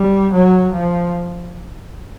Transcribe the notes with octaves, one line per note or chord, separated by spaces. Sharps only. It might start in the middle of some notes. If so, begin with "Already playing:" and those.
Already playing: G3
F#3
F3